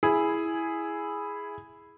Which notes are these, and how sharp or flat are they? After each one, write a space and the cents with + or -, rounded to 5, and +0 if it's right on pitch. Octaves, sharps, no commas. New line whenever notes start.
E4 +0 G#4 +0